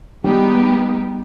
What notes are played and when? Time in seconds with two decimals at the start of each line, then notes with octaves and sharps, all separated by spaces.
0.24 G3 G#3 B3 D#4 G4